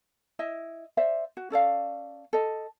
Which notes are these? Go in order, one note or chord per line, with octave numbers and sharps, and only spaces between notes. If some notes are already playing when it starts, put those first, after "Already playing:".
E4 D#5 E5
C5 D5 E5
F#4
C#4 A4 D5 F5
A4 D#5